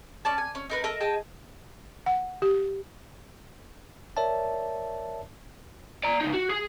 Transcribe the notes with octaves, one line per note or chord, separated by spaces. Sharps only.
C#4 D5 A5
G#5
C#4
D#4 A#4 B4
A4 A#4 D#5 E5
G#4 D#5 G5 A5
F#5
G4
A#4 C#5 D5 E5 A5
D5 A#5
C#2 D#4
F#4
G#4